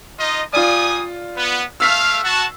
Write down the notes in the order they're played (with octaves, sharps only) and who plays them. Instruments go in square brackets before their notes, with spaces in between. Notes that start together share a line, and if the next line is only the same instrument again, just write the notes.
[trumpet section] D#4 F4 D#5
[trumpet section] G3 G#5 D#6 [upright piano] F4 D5
[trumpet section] B3
[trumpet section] A3 F5 [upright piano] E6 B6 C7
[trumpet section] F#4 A5